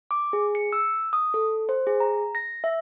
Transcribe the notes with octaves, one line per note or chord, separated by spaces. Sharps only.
D6
G#4
C#7
E6
D#6
A4
C5
G#4
A#5
A#6
E5